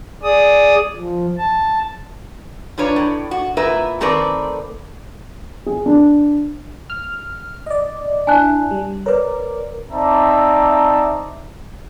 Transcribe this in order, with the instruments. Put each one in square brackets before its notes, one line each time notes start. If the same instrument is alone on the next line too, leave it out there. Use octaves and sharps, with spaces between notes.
[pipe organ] G#4 D5 D#6
F3
A5
[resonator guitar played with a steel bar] F3 D4 B4 C#5 A#5
A2
F#4
A#2 E4 A#4 B4 E5
D#3 A3 C4 A#4 B4 D5
[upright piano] G#4
D4
[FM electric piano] F6
D5 D#5
[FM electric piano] D4 E4 [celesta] G#5 A5 F#6
[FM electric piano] G3
[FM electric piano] A#4 D5 [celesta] B4 C#5
[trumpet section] C4 D#4 D5 E5 A5 A#5